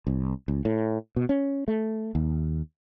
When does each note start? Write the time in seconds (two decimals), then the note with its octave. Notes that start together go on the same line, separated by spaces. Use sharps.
0.07 C2
0.48 C#2
0.65 A2
1.16 B2
1.29 C#4
1.68 A3
2.15 D#2